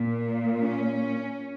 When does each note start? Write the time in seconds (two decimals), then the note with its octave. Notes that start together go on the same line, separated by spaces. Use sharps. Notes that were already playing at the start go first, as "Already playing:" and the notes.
Already playing: A#2
0.62 C#4